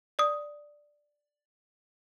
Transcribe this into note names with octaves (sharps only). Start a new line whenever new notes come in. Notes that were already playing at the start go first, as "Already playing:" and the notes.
D5 D#6